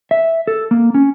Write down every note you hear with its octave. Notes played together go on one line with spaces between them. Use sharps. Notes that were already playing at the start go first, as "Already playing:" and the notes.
E5
A4
A#3
C#4